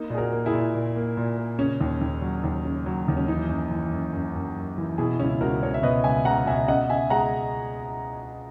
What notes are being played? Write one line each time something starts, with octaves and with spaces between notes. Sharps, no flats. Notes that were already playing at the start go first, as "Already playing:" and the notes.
Already playing: A#3 D#4
A#2 G#4
F#4 A#4
A#3
E4 G#4
A#2
A#2
A#3
A#2
A#3
C#3 C#4
D#2
D#2
F#3
D#2
C#3
F#3
D#2
C#4
E3 D#4
F#2
E3
F#2
F#2
F#2
F#2
E3
B2 E4 G#4
C#2 C#4 E4
C#2 F#4 A#4
C#2 A#4 C#5
E5
B2 B4 D#5
C#2 E5 G#5
C#2 F#5 A#5
B2 E5 G#5
C#3 D#5 F#5
C#3 E5 G#5
G#3 F#5 A#5